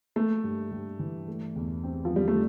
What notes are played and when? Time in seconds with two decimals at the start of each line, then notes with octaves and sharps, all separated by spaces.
0.16 A3 A#3
0.44 G2
0.72 G2
0.99 E3
1.28 A3
1.56 E2
1.84 C4
2.05 F3
2.11 D3
2.16 G3
2.28 A3